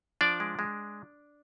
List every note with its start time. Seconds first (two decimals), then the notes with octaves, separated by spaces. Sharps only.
0.21 F3 D4 D5
0.40 G#3
0.59 G#3